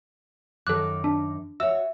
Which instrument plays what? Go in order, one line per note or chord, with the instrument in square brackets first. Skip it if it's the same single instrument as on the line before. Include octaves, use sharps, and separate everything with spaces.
[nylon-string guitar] F#2 D#3 [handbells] A4 F#6 [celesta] D6
[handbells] D4
[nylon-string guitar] F#4 C#5 [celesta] E5 [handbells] E6